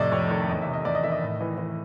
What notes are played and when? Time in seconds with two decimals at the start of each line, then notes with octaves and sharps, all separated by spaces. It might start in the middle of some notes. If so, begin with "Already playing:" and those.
Already playing: F2 A2 C3 D5 D#5
0.11 F2 C#5
0.31 D#3 C#5
0.49 E2 D#5
0.61 C3 E5
0.73 D#5
0.85 E2 D5
0.95 D#5
1.03 D#3 E5
1.12 D#5
1.22 A2
1.41 E3
1.58 E3